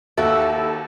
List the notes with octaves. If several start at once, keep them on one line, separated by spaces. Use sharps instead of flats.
D#2 E4 F#4 A4